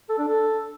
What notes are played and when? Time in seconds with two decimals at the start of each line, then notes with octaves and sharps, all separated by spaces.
0.09 A4
0.18 D4
0.27 A4